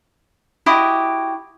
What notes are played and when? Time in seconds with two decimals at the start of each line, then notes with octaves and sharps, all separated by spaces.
0.66 E4 F#4 G4 D#5